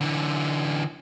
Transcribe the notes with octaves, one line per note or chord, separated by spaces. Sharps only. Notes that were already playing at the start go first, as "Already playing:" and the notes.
D3 E3